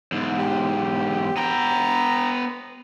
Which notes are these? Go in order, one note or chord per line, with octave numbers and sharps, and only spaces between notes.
E2 G#2
G4
B3 G5 A#5